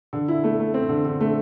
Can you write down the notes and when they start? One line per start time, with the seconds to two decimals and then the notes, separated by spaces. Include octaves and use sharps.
0.13 D3
0.28 E4
0.44 A3
0.60 A3
0.74 C4
0.89 D3
1.05 D3
1.21 A3